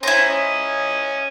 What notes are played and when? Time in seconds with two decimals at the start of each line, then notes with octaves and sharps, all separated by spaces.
0.03 C#4 E4 C5 A#5
0.29 C#4 D#5